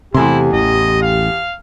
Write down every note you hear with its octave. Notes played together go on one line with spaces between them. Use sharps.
E2 C3 A3 E4 G4 G#5 C6
A1 D#5
F5